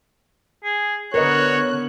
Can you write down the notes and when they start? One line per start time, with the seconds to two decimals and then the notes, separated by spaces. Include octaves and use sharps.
0.64 G#4
1.14 D3 B3 F#4 A#4 B4 C#5 D#5 F#6